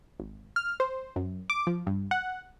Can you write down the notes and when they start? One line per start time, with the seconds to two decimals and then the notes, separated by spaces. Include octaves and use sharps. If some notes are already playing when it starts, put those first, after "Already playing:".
0.20 G#1
0.56 F6
0.80 C5
1.16 F#2
1.50 D6
1.67 F3
1.87 G2
2.11 F#5